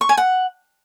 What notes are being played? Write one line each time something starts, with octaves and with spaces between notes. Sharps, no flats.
C#6
G#5
F#5